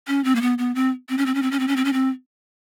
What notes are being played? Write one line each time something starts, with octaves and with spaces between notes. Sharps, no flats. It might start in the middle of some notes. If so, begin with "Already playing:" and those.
C#4
C4
A#3
B3
B3
C4
C4
C#4
C4
C#4
C4
C#4
C4
C#4
C4
C#4
C4